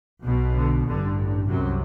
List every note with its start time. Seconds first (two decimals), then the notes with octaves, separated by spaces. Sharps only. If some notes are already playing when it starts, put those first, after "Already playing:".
0.22 B1 B2
0.54 D3
0.85 A1 G2 D3
1.49 C2 F#2 C3 F#3